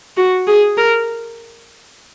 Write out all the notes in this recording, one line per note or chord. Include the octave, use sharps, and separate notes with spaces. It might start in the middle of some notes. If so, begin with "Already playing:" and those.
F#4
G#4
A#4